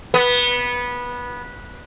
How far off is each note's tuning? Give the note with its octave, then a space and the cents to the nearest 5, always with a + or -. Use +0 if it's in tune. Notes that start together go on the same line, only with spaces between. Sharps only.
B3 -15